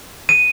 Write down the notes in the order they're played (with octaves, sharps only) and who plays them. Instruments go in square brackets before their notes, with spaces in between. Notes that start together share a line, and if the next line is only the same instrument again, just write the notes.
[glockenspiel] D#7